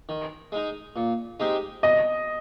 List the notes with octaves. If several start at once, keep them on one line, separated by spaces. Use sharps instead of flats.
D#3
G#3 D#4
A#2
G#3 C4 D#4 G4
C2 D#5